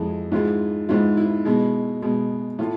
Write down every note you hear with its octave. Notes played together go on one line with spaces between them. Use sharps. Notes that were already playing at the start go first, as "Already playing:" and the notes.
Already playing: F2 E3 G#3
G#2 E3 G#3 F4
G#2 E3 G#3 F4
E4
B2 G#3
B2 G#3
A2 E3 F4